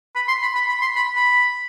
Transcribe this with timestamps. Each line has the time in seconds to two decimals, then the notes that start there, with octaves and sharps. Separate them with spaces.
0.15 B5
0.28 C6
0.42 B5
0.55 B5
0.69 B5
0.81 C6
0.95 B5
1.16 B5